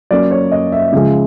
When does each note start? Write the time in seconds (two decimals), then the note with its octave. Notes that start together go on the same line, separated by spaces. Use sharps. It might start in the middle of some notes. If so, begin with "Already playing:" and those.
0.11 F#3 A#3 C#4 D5
0.31 C#5
0.52 D#5
0.72 E5
0.93 C#3 F3 G#3